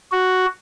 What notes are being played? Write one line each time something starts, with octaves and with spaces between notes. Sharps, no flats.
F#4